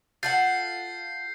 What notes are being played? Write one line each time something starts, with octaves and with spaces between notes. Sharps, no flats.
F4 A4 F#5 G6 A6 C7